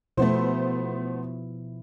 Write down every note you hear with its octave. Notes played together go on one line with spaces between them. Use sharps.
B2 F3 A3 B3 E4 C5